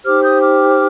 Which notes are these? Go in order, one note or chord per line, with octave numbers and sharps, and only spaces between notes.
D#4 G4 C5 D6 F6
D#6 G6
D6 F6